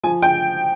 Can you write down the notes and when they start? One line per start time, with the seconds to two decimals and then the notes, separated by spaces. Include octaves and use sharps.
0.03 F3 G#5
0.22 G5